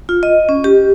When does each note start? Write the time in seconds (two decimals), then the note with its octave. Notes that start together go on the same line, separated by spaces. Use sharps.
0.09 F4
0.23 D#5
0.49 C#4
0.64 G4